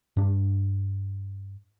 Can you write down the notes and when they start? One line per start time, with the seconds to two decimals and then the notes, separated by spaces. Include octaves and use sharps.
0.17 G2 D4